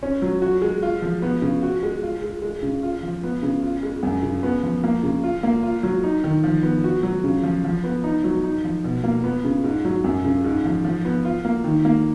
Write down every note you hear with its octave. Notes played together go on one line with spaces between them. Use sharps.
C#4
F#3
F#4
G#3
F4
F3
B3
C#3
F#4
G#3
F4
G#3
G#3
C#3
F4
F3
B3
C#3
F4
G#3
F#2
C#3
B3
F3
A#3
C#3
F4
A#3
F4
F#3
D#4
D#3
F3
B3
F#4
F#3
C#3
F3
F3
B3
D#4
F#3
D#4
F3
B2
A#3
B3
C#3
G#2
F#3
F#2
C#3
G#2
F3
F3
B3
F4
A#3
D#3
A#3